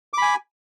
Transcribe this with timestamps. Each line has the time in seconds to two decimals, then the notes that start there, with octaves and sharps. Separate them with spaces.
0.13 D6
0.18 B5
0.22 G#5